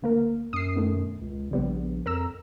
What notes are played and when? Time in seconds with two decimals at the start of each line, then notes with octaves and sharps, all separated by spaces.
0.02 D2 A#3 A#4
0.53 F#2 D#6 C7
0.76 B2 D#3 A3
1.21 C#2
1.51 A#1 C#3 G3 B3
2.06 F2 A#4 A#5 E6